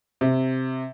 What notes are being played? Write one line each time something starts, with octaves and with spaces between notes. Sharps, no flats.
C3